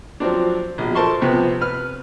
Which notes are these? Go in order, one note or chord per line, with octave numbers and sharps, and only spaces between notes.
F3 F#3 C4 D4
A#1 B2
A4 A#4 C5 A5 C6 C#6
C3 F3 B3 C4
B4 F6